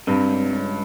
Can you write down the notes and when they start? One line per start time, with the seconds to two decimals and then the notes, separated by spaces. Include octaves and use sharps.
0.07 G2 C3
0.29 C#2
0.51 C#2